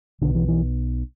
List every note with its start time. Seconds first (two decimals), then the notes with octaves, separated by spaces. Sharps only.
0.21 B1 B2 D3
0.35 E3
0.48 E3